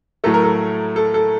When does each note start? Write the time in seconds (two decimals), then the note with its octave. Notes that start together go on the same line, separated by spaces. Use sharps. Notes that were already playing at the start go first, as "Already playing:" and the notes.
0.24 A2 F#3 A3 A4
0.34 A#4
0.44 A4
0.96 A4
1.14 A4